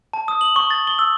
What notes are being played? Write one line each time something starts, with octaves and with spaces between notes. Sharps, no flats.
A5
D#6
F#7
C#6
A6
G7
E6